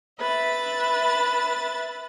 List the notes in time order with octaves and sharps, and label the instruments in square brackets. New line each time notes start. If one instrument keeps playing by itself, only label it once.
[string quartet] B4 E5 A6